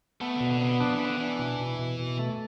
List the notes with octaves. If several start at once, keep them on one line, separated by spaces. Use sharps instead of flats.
A3 B3
B2 D3
D3
C3 D3 B3
F3 D4
E3
B3
D3
E3 D4
B2
B2
B2
B2
A3